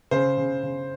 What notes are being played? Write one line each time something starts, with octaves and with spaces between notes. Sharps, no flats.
C#3 C5
C#3
C#3